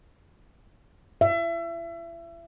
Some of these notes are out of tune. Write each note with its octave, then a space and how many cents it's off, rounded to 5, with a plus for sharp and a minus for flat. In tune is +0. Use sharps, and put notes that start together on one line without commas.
E5 +30